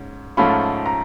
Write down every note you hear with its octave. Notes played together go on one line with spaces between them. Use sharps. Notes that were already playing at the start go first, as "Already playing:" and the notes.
Already playing: G#2 C#4
G#2 F3 A3 C#4 F4 B5
A#5